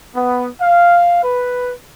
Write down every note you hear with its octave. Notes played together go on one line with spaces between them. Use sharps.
B3
F5
B4